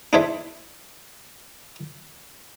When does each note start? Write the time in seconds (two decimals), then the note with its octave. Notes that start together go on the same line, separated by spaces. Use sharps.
0.13 D4 E4 G#4 A4 C5 E5